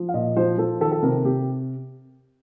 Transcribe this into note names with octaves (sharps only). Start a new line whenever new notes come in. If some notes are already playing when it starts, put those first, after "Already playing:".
Already playing: F3
F5
A#2 D#5
F3 C5
F3 A4
D#3 A4
A4
C3 A#4
C3 G4